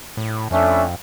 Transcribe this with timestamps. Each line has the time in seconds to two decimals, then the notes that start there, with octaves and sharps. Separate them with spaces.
0.17 A2
0.51 F2 A3 C#4 D4 E5